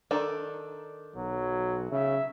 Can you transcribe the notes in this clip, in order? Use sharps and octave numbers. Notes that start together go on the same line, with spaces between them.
D#3 D4 A4
B1 F#3
C#3 E5